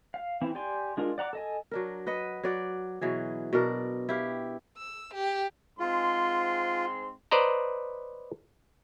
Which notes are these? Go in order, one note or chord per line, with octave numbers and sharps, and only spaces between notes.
F5
E3 C4 E4
G4 D5 G5 G#5 C6
G#3 D4 F4 A#4
D5 F#5 A#5 D6
A4 D#5 G#5
F#3 D4 A#4
B4 D#5 F#5
F#3 D5 F#5
B2 E3 F#3 G#4
B2 D4 A#4
E4 G4 F5
E6
G4
G#2 C4 F4 C6
B4 C5 D5 D#5 A#5